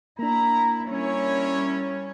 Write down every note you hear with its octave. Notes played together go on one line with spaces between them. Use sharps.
A#3 D4 E4 A#5
G3 C#4 E4 A#4 C#5